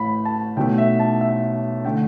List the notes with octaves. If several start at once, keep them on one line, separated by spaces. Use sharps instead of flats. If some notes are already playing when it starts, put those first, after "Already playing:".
Already playing: A1 A2 A3 B5
A5
B1 B2 A3 G5
E5
A5
E5
D3 A3 G5